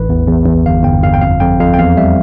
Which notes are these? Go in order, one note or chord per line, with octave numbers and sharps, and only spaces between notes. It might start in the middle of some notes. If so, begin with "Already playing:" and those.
Already playing: A1 B4
E2
E2
E2
G1 F5
G1 G5
G1 F5
G5
F2 F5
F2 G5
F2 F5
G5
E2 F5
G3 E5